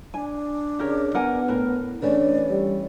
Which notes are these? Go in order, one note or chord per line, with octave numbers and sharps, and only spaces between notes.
D4 G#5
C#3 G4 A#4 C#5
B3 A#4 F#5 G#5
A2 A#4 B4
E3 A3 C#4 D4 D5
G3